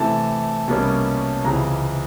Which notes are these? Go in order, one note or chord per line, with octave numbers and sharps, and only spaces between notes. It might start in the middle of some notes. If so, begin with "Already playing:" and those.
Already playing: C3 E3 A3 A5
C2 B2 G3 A#3 C#4
C#2 C3 E3 A#5